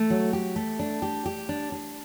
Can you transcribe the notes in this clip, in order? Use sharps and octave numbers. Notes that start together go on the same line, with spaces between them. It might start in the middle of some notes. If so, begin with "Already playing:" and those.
Already playing: A3
F#3
G4
A3
D4
G4
G4
D4
D4